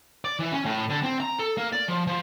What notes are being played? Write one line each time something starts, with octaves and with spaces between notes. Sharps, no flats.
D5
E3
C#4
A2
D3
C4
A#5
A4
A#3
D5
F3
F3